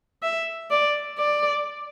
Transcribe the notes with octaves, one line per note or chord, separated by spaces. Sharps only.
E5
D5
D5